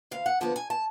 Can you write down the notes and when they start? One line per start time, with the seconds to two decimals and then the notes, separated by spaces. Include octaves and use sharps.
0.11 D2 F5
0.26 F#5
0.41 D3 F3 B3 A5
0.56 G#5
0.70 A5